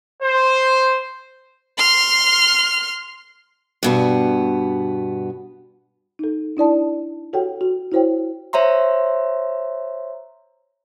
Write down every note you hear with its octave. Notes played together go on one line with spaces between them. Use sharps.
C5
C6 F6
G2 B2 B3
D#4 A4
D4 E4 D5 A5
F#4 G4 A4 C#5 F#5 G5
F#4
E4 F#4 C5 C#5 G5
C5 C#5 E5 A#5 C6